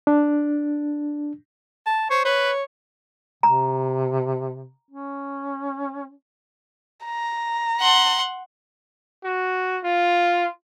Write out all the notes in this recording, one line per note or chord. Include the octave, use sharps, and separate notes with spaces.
D4
A5
C5 C#5
B4 C#5
C3 A#5
C#4
A#5
F#5 C6
F#4
F4